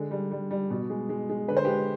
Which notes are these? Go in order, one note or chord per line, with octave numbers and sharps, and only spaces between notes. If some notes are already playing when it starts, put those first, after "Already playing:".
Already playing: D3 G#3
G3
G3
G3
B2
G#3
G#3
G#3
D3 B4
C5
G#3 G4 B4